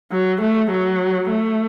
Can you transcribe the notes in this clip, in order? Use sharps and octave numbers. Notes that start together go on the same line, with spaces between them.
F#3
A3
F#3
A3